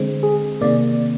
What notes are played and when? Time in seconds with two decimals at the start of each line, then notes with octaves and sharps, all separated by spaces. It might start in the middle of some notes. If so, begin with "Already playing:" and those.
Already playing: D3 G#3 C4
0.23 G#4
0.61 C3 D#3 A#3 D5